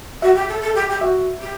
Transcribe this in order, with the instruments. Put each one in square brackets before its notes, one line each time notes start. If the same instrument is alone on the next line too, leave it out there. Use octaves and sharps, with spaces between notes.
[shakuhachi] F#4 [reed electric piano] E5
[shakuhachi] G4
A4
A4
G4
G4
[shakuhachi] F#4 [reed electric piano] E5
[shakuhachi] G4